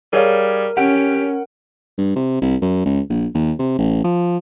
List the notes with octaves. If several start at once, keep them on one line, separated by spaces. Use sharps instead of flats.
G3 G#4 A#4 C#5 F5
C#4 G4 F#5 D7
G2
C3
C2
F#2
C#2
A#1
D#2
C3
A1
F3